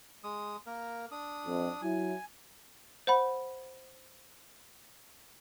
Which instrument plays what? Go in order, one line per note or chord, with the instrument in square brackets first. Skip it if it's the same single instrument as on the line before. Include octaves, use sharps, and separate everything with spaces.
[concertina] G#3 D#6
A#3 A#4
D4 D#6
[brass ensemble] F2
[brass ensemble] F#3 E4 [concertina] G#5
[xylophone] C5 F#5 B5